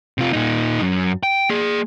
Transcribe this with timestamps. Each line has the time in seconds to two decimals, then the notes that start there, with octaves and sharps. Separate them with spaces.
0.18 C3 F4
0.33 A#2 D#4
0.81 F#2
1.23 G5
1.49 A#3 G#4